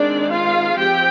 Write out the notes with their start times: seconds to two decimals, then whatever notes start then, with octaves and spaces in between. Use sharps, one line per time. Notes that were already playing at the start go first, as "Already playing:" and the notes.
Already playing: D#3 G#3 C4 D4 D5
0.30 F4 F5
0.77 F3 C4 G4 G5